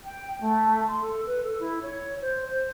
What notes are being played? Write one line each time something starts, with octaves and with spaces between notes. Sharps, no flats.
G5
A3
C6
A4
B4
A4
E4
C#5
C5
C5